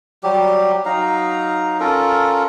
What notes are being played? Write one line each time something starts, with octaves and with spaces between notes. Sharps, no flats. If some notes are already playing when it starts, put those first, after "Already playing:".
F#3 G3 G4
F#3 D#4 F5 A#5
C#4 F4 A4 A#4